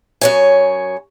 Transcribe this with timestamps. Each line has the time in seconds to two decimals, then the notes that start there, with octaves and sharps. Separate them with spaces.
0.21 F#2 C#5 G#5